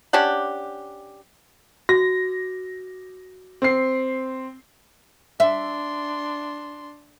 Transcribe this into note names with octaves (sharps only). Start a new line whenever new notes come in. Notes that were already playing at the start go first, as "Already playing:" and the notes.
C#4 D4 G4 F#5
F#4 A#6
C4 C7
D4 E5 C6